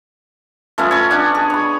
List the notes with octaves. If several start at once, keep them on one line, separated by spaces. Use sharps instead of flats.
F3 A3 B3 C#4
C#5 G#5
D4 F#5
G#4
C#5 B5